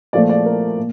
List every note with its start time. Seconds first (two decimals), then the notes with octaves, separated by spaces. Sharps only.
0.13 A#2 F3 A3 D5
0.29 D5
0.45 A#4
0.77 A#2